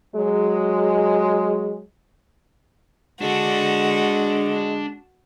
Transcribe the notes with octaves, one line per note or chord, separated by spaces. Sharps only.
F#3 G#3
G#3 D4 F#4 A4